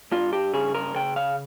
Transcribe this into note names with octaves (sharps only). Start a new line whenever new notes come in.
G2 F4
G4
C#3 G#4
A#4
C#3 G5
F5